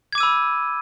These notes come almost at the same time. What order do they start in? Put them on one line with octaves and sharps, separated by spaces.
G#6 D6 D#7 E6 B5